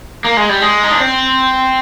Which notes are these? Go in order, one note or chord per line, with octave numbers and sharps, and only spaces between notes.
A#3
G#3
G3
G#3
D#4
D4
C4